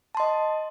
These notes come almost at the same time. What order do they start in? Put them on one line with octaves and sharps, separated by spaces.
A5 C6 D#5